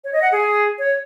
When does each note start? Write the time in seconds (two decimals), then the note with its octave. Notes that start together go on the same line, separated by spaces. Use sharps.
0.04 C#5
0.13 D#5
0.22 F#5
0.32 G#4
0.79 C#5